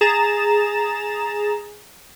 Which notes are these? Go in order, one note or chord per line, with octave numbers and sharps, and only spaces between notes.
G#4 A#5 A6 E7